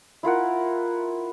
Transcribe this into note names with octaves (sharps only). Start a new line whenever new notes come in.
E4 F4 A#4 F#5